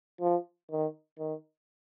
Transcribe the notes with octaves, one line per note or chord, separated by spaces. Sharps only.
F3
D#3
D#3